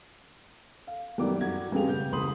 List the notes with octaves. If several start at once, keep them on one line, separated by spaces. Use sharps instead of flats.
F5
F#2 D#3 G3 E4 D6
F#4 G#6
G2 C4 G4 G#4 F5 F7
C#3 G6
C2 C#3 B5 C6 D#6 F#7